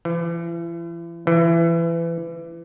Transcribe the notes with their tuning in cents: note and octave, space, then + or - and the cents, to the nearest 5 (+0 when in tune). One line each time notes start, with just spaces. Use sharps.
E3 +40
E3 +25